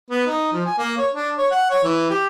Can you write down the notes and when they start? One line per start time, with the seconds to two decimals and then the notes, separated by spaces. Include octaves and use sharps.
0.10 B3
0.27 D#4
0.53 F3
0.66 G#5
0.78 A#3
0.98 C#5
1.14 D4
1.38 C#5
1.51 F#5
1.70 C#5
1.84 E3
2.10 G4